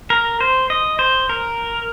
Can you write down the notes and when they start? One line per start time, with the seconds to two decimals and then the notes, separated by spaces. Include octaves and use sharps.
0.10 A#4
0.40 C5
0.70 D#5
0.99 C5
1.29 A#4